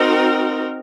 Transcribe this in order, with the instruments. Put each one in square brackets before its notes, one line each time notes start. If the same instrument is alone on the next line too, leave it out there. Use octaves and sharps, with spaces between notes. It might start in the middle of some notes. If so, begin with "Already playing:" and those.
Already playing: [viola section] C4 D#4 F#4 A#4